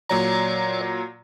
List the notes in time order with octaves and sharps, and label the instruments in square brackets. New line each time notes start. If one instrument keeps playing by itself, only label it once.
[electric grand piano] A#2 F#3 A#5 [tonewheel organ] C#5 D5